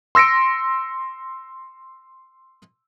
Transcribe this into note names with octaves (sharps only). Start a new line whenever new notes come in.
C6 E6 A#6 C#7 D7